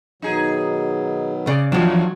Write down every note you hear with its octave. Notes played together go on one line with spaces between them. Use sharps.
B2 D#3 F#3 D#4 G#4
C#3 D5
E2 A2 D#3 F3 F#3 D4